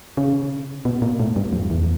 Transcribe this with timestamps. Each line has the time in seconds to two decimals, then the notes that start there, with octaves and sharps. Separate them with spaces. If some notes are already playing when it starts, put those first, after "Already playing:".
0.17 C#3
0.85 B2
1.02 A#2
1.20 A2
1.36 G2
1.53 F2
1.70 E2